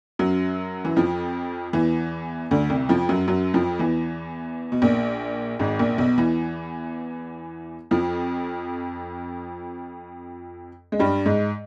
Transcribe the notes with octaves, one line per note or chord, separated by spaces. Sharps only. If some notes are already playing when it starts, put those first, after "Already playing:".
F#2 F#3
E3
F2 F3
E2 E3
D2 D3
C2 C3
F2 F3
F#2 F#3
F#2 F#3
F2 F3
E2 E3
B2
A#1 A#2
G#1 G#2
A#1 A#2
B1 B2
E2 E3
F2 F3
G#3
G2 G3
G#2 G#3